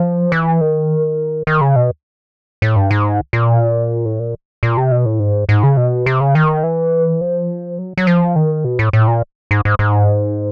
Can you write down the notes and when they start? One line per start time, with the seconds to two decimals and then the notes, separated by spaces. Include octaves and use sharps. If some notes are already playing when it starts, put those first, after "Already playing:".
Already playing: F3
0.32 E3
0.61 D#3
1.47 D#3
1.61 C#3
1.76 B2
2.62 A2
2.76 G2
2.91 G#2
3.33 A#2
4.05 A2
4.20 A#2
4.63 A#2
4.77 C3
4.91 B2
5.06 A2
5.20 G#2
5.49 G#2
5.63 C#3
5.77 B2
6.06 C3
6.21 C#3
6.35 D#3
6.63 E3
7.21 F3
7.79 F#3
7.97 F#3
8.07 F3
8.36 D#3
8.65 B2
8.79 A2
8.93 A2
9.07 A#2
9.51 G#2
9.65 G#2
9.79 G#2